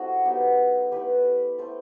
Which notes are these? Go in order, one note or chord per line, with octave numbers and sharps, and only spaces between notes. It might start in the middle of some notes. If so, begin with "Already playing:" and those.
Already playing: G3 C4 E4 F#4 A4 D#5 F#5
F#3 B3 D#4 G4
A3 E4 G4 B4
A3 E4 A4 C5